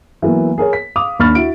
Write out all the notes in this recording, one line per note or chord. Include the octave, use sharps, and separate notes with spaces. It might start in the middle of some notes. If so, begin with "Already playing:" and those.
E3 F#3 A#3 B3
G#4 A#4 C#5
B6
F5 D6 D#6 F7
D#2 D4 B5 C#6 F6 A6
E4 F#4 D7